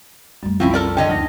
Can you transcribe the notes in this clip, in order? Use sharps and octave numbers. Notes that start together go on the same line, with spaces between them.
F#2 G3 A3
C2 C3 F3 C4 C#4 E4
A4 A#4 D5
D2 D3 C#5 D#5 G5
D2 F3 A#3 D#4 A#6